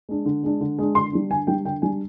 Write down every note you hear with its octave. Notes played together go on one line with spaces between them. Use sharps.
G#3 D4
D3
G#3 D4
D3
G#3 D4
D3 C6
G3 D4
D3 G#5
G3 D4 G5
D3 G5
G3 D4 G#5